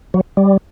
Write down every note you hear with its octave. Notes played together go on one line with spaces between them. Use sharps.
F#3
G3